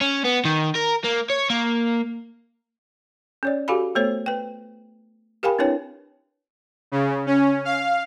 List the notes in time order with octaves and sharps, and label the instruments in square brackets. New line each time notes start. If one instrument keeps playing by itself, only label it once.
[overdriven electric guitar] C#4
B3
D#3
A#4
A#3
C#5
A#3
[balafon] C#4 C#5 D5
F#4 G4 A4 F5 G#5 B5
A3 B3 A4 C5 C#5
B4 G5
G4 A#4 F5 G5 G#5 B5
C4 D4 E4 B4 C#5 G5
[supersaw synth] C#3
C#4
F5